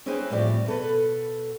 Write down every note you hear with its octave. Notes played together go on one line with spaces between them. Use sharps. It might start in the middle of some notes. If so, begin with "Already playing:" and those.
C4 C#4 E4 G#4 B4 C5
E2 A2 F3 G3 C4 D5
B2 A4 B4